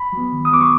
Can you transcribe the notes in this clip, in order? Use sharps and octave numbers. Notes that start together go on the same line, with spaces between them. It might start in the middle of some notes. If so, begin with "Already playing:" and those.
Already playing: B5
F#3 B3
D#3
D#6
F#3 B3 D6
C#6